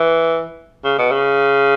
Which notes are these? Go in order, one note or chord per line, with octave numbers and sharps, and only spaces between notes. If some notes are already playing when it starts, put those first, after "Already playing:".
Already playing: E3
C#3
B2
C#3